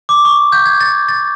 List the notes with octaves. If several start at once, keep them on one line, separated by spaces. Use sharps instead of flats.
D6
C#6
G6
G#6
A6
A6